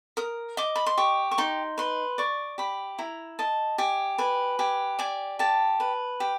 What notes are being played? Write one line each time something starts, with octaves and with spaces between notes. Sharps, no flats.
A#4 D#6
D#5 D6
B5
C6
G4 C#6
C#6
D#4 C6
B4 C6
D5 C#6
G4 B5
E4 A#5
D#5 A5
G4 G#5
B4 G#5
G4 G#5
D5 G#5
G4 A5
B4
G4